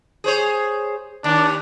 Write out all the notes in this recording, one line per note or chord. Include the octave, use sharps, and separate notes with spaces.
G#4 C5 C#5
D#2 D4